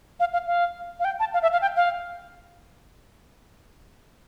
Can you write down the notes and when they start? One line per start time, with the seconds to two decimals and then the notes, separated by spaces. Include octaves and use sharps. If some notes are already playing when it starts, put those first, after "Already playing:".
0.20 F5
0.33 F5
0.47 F5
1.00 F5
1.05 G5
1.20 A5
1.34 F5
1.42 E5
1.53 F5
1.62 G5
1.76 F5